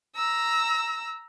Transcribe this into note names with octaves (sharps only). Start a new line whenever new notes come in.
A#5 E6